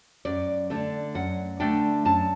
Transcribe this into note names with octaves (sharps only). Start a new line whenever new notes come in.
F#2 D5
D3 A3 D4
F#2 F#5
D3 A3 D4 G5
F#2 A5